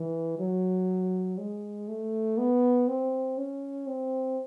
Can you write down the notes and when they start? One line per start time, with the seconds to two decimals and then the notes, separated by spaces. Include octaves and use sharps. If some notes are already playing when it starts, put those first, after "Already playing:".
Already playing: E3
0.39 F#3
1.38 G#3
1.88 A3
2.38 B3
2.88 C4
3.38 C#4
3.87 C4